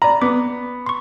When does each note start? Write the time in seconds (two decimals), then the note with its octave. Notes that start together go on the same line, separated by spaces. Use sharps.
0.02 D5 A#5 B5
0.22 B3 D6
0.86 C6 C#6